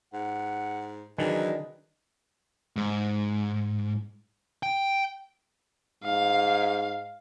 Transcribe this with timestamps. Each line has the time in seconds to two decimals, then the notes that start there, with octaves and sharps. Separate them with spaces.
0.14 G#2 F#5
1.18 D#3 E3 F#3 D4 G#4 D#5
2.76 G#2
4.63 G5
6.04 G#2 F5